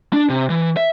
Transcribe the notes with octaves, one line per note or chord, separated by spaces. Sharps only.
D4
C3
E3
E5